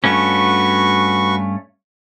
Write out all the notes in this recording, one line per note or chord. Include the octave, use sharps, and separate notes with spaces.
G2 A3 C#4 F#4 B4 C#6